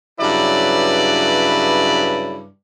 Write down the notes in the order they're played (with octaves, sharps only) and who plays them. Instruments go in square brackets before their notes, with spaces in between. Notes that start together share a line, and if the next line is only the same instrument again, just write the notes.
[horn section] G2 C#3 F#3 E4 B4 D5